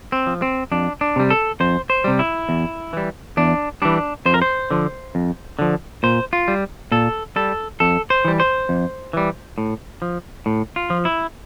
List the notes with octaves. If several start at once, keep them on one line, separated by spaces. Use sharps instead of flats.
C4
F3
C4
F2 D4
D4
C3 G3
A4
F2 C5
C5
C3 G3
E4
E2
E3 G3
E2 D4
E3 G3 D4
F2 C5
A#4
C5
D3 F3
F2
D3 F3
A#2 C5
F4
G3
A#2 A4
G3 A4
F2 A4
C5
E3 G3
C5
F2
E3 G3
A2
F3
A2
F4
F3
E4